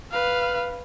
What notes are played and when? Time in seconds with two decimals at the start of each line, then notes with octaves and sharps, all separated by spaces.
0.12 B4 F5